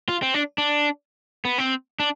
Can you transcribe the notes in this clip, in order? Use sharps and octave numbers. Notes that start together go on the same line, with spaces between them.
F4
C4
D4
D4
B3
C4
D4